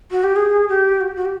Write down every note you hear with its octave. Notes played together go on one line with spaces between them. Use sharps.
F#4
G4
G#4
G4
F#4
G4
F#4
G4